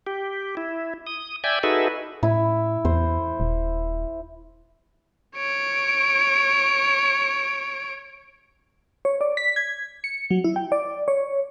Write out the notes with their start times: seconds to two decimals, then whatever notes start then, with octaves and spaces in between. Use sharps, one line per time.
0.07 G4
0.57 E4
1.07 D#6
1.44 D5 E5 G5 G#5
1.63 D#4 F#4 G#4 A4 B4 E5
2.23 A2 E4
2.85 E2 C5
3.40 D#1
5.37 C#5 D7
9.05 C#5
9.21 D5
9.37 B6
9.56 G#6
10.04 C#7
10.31 F#3
10.44 E4
10.56 G5
10.72 D5
11.08 C#5